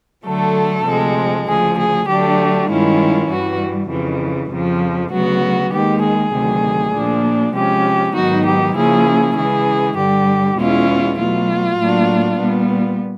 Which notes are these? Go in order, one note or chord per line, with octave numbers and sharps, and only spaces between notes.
D3 F#3 A3 A4
D2 C3 F3 G#3
D2 C#3 F3 G#4
G#4
D3 F#3 A3 D4 G4
G2 D#3 G#3 C#4 E4 F4
G2 E3 G3 F#4
F2 C#3 E3
F2 C#3 F3
D2 C#3 F#3 B3 F#4
D#2 D#3 G#3 G4
G#4
D2 C3 D#3 F#3
A#2 F3 A#3 D4
C3 F3 G#3 C#4 G4
G#2 D#3 F#3 B3 D#4 F#4
G4
C#3 F3 A#3 C#4 E4 G#4
C#3 E3 G#3 G#4
G2 D3 G3 G4
E2 B2 G#3 C#4 E4 F4
B2 F#3 A3 F4
A2 F#3 A#3 D4
A#2 G3 B3